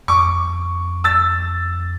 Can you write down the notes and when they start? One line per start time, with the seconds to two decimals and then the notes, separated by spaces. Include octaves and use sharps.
0.08 F2 C#6 D6
1.04 E6 A6